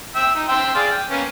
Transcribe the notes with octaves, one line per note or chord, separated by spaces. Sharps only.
E5 G5
D#4
E5 G5 C6
G#4 D5 F5
G5
A#3 B3 C#4